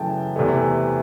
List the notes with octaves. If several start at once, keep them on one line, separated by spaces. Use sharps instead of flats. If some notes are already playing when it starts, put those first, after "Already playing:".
Already playing: F#2 C#3 E3 A3 G5 A5
E2 C3 E3 A3